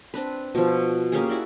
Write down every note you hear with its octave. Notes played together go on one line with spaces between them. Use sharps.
C4 D4 B4
B2 F3
A#3 C#4 G4 G#4
E4 F#4 D5